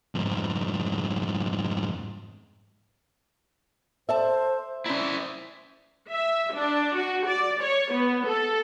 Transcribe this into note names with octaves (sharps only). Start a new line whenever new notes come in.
F2 G#2
A4 C5 D5 E5 A5
C#4 E4 C5 D5 A#5
E5
D4
F#4
D5
C#5
B3
A4